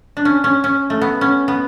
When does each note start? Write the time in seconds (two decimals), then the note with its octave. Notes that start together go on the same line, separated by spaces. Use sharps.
0.17 D4
0.25 C#4
0.44 C#4
0.64 C#4
0.90 A3
1.01 B3
1.21 C#4
1.48 B3